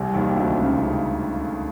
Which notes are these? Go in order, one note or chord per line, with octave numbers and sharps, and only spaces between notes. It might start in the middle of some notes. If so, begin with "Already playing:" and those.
Already playing: C2 C3
D#2 D#3
D2 D3
C#2 C#3
C#3